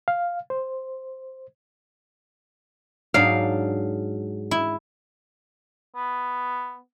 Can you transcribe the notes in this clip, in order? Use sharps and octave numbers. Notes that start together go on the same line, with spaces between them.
F5
C5
G#2 F#3 D4 F5
E4
B3